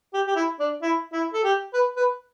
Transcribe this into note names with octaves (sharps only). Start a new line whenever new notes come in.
G4
G4
E4
D4
E4
E4
A4
G4
B4
B4